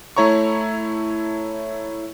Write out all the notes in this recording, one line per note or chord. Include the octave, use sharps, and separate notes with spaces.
A3 E4 C#5 A#5 C#6